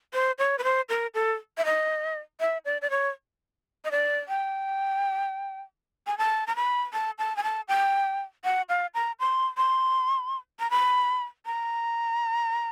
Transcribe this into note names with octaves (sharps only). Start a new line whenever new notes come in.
C5
C#5
B4
C5
A#4
A4
E5
D#5
E5
D5
D5
C#5
D#5
D5
G5
G#5
A5
A#5
B5
A5
A5
G#5
A5
G5
F#5
F5
A#5
C6
C6
A#5
B5
A#5